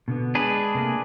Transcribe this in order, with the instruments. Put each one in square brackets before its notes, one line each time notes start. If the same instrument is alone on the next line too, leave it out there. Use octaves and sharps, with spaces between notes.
[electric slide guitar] B2 D3 B3
[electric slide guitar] G#3 [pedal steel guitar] D4 G#4 B4
[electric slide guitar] C3 A3 A#3